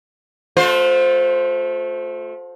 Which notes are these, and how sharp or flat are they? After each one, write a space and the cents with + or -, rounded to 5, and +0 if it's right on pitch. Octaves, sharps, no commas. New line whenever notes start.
A3 -15 F4 +40 C5 +0